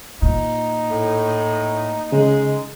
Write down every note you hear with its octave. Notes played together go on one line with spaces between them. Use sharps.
A#2 D#4
A2
C#3 G#3